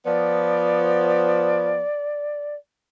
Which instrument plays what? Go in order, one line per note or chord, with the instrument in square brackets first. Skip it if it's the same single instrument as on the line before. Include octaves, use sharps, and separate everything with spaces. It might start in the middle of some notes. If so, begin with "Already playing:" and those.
[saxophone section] F3 B3 [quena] D5